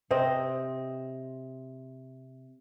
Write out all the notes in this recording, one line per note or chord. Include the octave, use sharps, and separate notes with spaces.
C3 C4 D#5